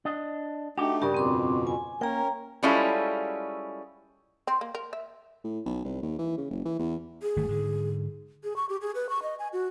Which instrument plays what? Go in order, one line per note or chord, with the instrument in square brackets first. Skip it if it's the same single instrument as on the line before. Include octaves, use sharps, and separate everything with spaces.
[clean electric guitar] D4 D#5
[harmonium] A3 D#4 [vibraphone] D4 [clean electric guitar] F#4 G4
[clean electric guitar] G2 C#3 [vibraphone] G4 A#4 D5
[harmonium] F2 B2 [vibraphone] C4 C6 D6
[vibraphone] G#5
[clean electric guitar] A#3 [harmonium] C#4 A#4 [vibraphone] G5 A#5
[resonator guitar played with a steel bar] G3 G#3 C#4 E4 F4 A4
[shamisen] C4
A#3
A#4
E5
[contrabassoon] A2
B1
C2
D#2
E3
C#3
F#1
E3
E2
[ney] G#4
[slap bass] G1 D#3 A3
G#2 D3
[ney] G#4
C#6
G4
G#4
B4
C#6
D#5
G#5
F#4